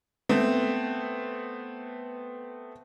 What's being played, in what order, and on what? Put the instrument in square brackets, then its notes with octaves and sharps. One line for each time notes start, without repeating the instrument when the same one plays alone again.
[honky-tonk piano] A3 B3 C4